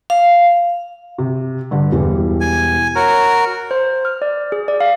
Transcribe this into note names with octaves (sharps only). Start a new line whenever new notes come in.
F5
C3
G2 D3
E1 E3 G3
G#5
F#4 A#4 C#5
C5
F6
D5
G#4
D5
F5